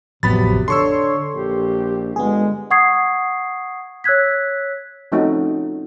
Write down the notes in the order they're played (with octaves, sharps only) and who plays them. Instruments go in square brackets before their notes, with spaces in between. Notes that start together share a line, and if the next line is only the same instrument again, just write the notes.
[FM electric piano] A1 F2 [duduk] C3 [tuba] F#3 [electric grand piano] B3 B5 A6
[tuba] D3 [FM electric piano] A4 [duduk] C#5 [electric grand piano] C6 C#6 E6
[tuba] A#1 [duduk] G4
[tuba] G1 [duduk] G#3 [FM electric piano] B3 G#4
[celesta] F#5 C#6 D#6 G#6 C7
C#5 E6 F#6 G#6 B6
[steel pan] F3 A3 C4 C#4 D#4 F#4